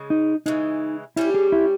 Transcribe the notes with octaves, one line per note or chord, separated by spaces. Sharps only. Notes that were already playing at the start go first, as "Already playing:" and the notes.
Already playing: C#3 G#3
D#4
C#3 E3 G#3 D#4
G3 C#4 E4 G4
G#4
E4